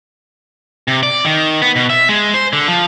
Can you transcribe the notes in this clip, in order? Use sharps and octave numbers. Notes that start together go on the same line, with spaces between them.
C3
D5
D#3
B3
B2
E5
G#3
C5
D3
F3